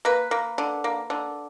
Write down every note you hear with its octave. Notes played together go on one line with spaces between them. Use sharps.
A#3 B4
A#3
D3
A#3
D3